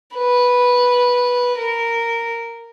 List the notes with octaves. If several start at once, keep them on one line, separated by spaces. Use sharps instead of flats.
B4
A#4